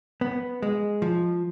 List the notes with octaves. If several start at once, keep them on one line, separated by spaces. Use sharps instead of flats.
B3
G#3
F3